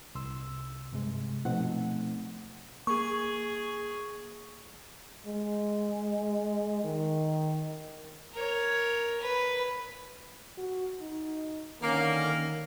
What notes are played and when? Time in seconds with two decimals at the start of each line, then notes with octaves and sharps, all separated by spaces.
0.15 C2 C6 E6
0.92 G2 C3 G#3
1.45 B2 F3 A3 C4 D#4 F#5
2.87 A#3 G#4 C#6
5.26 G#3
6.84 D#3
8.33 A#4 C#5
9.21 B4
10.58 F#4
11.01 D#4
11.82 D3 D#3 A#3 C#4 A#4